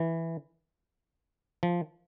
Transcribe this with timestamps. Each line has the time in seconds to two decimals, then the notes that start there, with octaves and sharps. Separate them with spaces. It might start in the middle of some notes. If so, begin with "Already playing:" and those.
Already playing: E3
1.63 F3